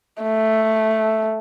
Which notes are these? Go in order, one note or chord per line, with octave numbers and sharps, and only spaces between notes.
A3